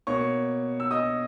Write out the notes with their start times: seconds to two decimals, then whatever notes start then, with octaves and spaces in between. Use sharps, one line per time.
0.07 B2 A#3 C#5 C#6
0.80 E6
0.91 D#5 D#6